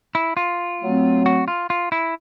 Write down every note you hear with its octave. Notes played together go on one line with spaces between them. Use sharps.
E4
F4
F#3 A3 C4
F#4
F4
F4
E4